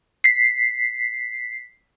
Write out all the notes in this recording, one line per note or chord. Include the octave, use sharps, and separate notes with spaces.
B6 C7